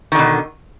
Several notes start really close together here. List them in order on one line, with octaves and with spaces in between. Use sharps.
D#3 D3 B2